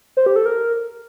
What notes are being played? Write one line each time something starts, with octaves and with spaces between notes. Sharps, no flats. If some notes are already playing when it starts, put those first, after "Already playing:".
C5
G4
A4
A#4